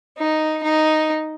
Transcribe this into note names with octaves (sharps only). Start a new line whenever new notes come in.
D#4
D#4